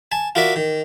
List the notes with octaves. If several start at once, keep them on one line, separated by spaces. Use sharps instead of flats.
G#5 A5
F4 F#4 A#4 D5 E5
D#3